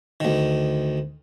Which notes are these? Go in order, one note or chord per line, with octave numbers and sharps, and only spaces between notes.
D2 D#3